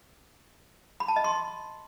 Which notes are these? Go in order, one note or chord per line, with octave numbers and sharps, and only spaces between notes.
B5
A5
D#5
C6